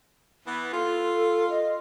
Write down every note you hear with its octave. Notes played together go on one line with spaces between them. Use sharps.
E3 B3
F4 A4
D#5